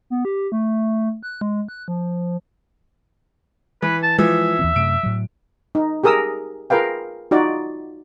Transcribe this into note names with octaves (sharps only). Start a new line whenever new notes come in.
B3
G4
A3
F#6
G#3
F#6
F3
E3 B4
A5
E3 F3 G#3 E5
D#2 E3 C4
F#2 C3 A3 D7
A2 F#3
D#4
G4 G#4 A#4 D#6 E6
F4 G#4 A#4 B4 F5 G5
D#4 F4 F#4 D5